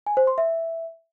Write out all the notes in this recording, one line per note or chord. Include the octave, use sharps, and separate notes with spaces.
G#5
C5
C6
E5